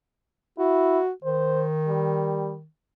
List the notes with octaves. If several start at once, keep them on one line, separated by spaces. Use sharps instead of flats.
E4 F#4
D#3 C5
G3